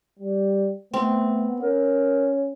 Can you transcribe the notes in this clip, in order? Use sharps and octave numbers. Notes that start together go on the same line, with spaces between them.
G3
A3 B3 C4
C#4 A#4